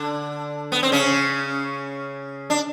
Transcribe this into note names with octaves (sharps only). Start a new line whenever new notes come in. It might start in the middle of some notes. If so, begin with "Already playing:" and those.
Already playing: D3 D4
B3
C4
C#3 C#4
D4